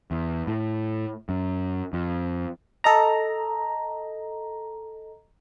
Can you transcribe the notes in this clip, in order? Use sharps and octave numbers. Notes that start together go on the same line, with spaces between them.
E2
A2
F#2
F2
A4 D#5 A#5